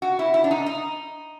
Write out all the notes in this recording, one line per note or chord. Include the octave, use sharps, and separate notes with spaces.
F#4
E4
E4
D4
D#4
D#4